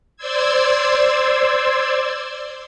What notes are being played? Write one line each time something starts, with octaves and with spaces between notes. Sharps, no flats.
C5 D5 C6 E6 G#6